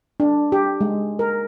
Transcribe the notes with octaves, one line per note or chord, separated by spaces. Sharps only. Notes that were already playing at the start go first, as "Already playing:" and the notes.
D4
G4
G#3
A#4